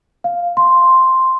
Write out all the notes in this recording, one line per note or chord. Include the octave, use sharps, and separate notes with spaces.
F5
C6